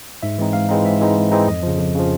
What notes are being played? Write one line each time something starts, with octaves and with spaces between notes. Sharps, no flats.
G#2 E5
E3 G#3 C4 D#4
G#2 F5
E3 G#3 C4 D#4
G#2 E5
E3 G#3 C4 D#4
G#2
E3 G#3 C4 D#4
F2 D#5
C#3 F3
F2
C#3 F3